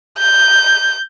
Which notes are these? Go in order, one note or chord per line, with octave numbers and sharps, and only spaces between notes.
G6